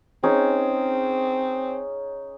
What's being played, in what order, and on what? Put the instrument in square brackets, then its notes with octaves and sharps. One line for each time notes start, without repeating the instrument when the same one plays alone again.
[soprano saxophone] C4 [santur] C#4 D#4 G#4